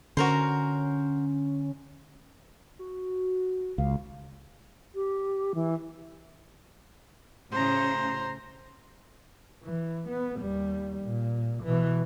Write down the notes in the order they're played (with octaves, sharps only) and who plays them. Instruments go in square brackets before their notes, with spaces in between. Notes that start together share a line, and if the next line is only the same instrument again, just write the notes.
[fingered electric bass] D3 [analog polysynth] C#4 [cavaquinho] F#4 A#4 C5
[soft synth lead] F#4
[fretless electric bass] C#2 [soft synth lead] F5
[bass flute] G4
E3
[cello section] A2 C#3 [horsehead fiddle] C5 A#5
[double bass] E3
B3
D#2 G3
A#2
B2 E3